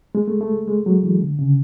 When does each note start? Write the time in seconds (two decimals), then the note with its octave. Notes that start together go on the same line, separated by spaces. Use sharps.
0.15 G#3
0.28 A3
0.41 A3
0.67 G#3
0.86 F#3
1.03 E3
1.22 D3
1.39 C#3